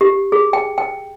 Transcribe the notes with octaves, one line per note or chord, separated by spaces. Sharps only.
G4
G#4
G5
G5